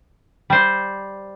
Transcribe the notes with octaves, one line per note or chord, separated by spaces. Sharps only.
G3 C5